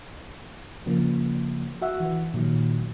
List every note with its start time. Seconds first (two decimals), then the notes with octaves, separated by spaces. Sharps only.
0.86 C#3 F3 A#3
1.82 F#4 E5 F#5 E6
2.00 E3
2.34 A#2 D#3 F#3